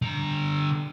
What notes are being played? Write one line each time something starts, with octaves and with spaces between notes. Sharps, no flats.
D3 A#5